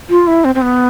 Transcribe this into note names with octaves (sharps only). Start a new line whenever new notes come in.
F4
E4
C4
C4
B3